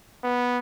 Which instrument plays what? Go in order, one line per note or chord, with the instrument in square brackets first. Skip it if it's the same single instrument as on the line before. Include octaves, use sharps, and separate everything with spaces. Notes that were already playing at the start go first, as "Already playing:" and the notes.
[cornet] B3